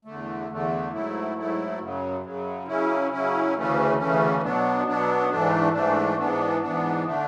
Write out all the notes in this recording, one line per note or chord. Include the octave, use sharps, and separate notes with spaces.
E2 D3 A3
E2 D3 A3
G#2 F#3 A3 E4
G#2 F#3 A3 E4
F#2 C#3 F#3
F#2 C#3 F#3
C#3 F#3 C#4 E4
C#3 F#3 C#4 E4
D2 C#3 E3 A3 C#4
D2 C#3 E3 A3 C#4
B2 F#3 B3 D4
B2 F#3 B3 D4
G#2 E3 A3 D4
G#2 E3 A3 D4
G#2 E3 B3 D4
G#2 E3 B3 D4
D3 A3 D4